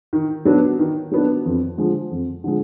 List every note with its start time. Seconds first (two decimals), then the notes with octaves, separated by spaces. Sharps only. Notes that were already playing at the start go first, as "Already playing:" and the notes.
0.13 D#3
0.45 F#3 B3 D4
0.79 D#3
1.11 F#3 B3 D4
1.45 F2
1.77 D3 F3 G#3
2.11 F2
2.44 D3 F3 G#3